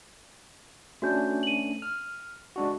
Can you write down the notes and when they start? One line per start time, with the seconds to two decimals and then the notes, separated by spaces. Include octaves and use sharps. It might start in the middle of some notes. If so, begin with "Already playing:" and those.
1.02 A3 C#4 D4 F#4 G6
1.43 D#7 F#7
1.82 F6
2.56 G#3 D4 F#4